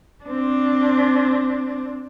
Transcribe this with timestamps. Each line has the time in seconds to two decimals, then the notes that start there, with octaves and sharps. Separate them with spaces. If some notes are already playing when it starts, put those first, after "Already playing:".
0.24 C4 D4